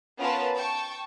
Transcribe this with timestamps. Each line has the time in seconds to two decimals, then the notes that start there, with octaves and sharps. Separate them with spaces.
0.19 B3 C#4 F4 A#4 B4 A5
0.55 G5 A5 C#6